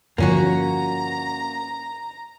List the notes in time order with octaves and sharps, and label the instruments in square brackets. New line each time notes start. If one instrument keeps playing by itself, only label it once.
[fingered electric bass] G2 D3 F3 [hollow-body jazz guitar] A#3 C#4 F#4 [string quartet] A#5